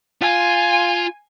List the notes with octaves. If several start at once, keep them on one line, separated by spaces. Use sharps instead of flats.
F4 G#5